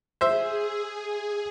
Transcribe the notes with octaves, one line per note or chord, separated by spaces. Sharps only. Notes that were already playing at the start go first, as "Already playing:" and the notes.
G#4 C5 E5